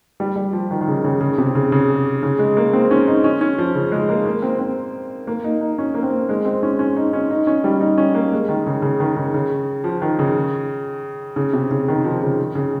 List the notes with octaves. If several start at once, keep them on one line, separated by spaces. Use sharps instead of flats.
G3
G3
F3
D#3
D#3
C#3
C#3
C#3
C3
C#3
C#3
C#3
G#3
A#3
C4
C#4
D#4
C#4
C#4
F3
C#3
G#3
A#3
A#3
C4
C4
A#3
D#4
D#4
C#4
A#3
C4
G#3
C4
C#4
C#4
D#4
C#4
D#4
C#4
G3
D#4
C#4
A#3
G#3
D#3
C#3
C#3
D#3
C#3
C#3
F3
D#3
C#3
C#3
C3
C#3
D#3
F3
C#3
C#3